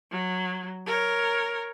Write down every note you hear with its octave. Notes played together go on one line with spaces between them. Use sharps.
F#3
A#4 C#5